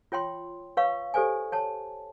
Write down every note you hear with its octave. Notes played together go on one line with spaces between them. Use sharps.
F4 C#5 G5 C6
B4 C#5 F5 C#6
G4 A4 C5 D5 G#5
C#5 A5